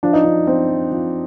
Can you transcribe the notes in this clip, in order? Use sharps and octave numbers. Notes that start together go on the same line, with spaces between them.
F3 D4
D#4
F3 D4
F3 C4
F3
F3